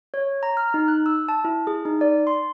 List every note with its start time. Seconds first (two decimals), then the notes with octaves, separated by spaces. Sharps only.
0.14 C#5
0.43 A#5
0.57 F6
0.74 D#4
0.88 F#6
1.06 E6
1.28 A5
1.45 E4
1.67 G#4
1.85 D#4
2.01 D5
2.27 C6